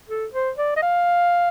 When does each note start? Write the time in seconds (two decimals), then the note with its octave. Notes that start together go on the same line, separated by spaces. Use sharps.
0.09 A4
0.34 C5
0.58 D5
0.76 D#5
0.82 F5